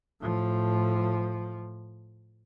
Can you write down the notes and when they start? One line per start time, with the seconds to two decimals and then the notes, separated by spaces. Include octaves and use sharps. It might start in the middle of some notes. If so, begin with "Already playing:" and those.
0.21 A2 F3